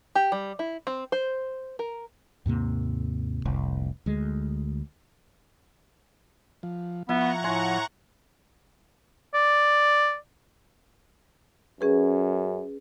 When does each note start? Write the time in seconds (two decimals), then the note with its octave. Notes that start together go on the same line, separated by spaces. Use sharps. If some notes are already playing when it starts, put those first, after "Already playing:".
0.15 G4
0.32 G3
0.59 E4
0.87 C4
1.12 C5
1.79 A#4
2.46 D#2 G#2 C3 A#3
3.45 F1 C2
4.06 D2 G#3
6.63 F3
7.09 F3 B3 E4 F#5 A#5 C#6
7.44 A2 G#5 C6
9.34 D5
11.81 F#2 C#4 G#4 B4